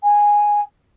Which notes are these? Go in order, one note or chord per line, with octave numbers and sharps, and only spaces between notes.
G#5